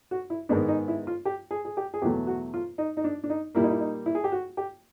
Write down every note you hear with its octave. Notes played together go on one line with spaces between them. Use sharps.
F#4
E4
G#2 D#3 G#3 B3 D4
D#4
E4
F4
G4
G#4
G#4
G4
G#4
E2 B2 F#3 A3 G4
F#4
F4
D#4
D#4
D4
D4
D#4
A#2 G3 A#3 E4
D#4
E4
D#4
E4
G#4
G4
F#4
G4